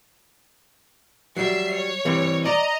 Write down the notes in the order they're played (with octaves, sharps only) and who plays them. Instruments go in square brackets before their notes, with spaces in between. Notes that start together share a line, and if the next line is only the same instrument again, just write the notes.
[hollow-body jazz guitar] F#3 G3 [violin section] E5 C7
[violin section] C#5
[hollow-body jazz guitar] E3 G3 C4
[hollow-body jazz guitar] D5 [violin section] D#5 A#5